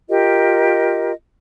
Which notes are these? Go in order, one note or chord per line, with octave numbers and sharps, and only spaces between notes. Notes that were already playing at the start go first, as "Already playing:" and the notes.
F4 G4 A#4 D#5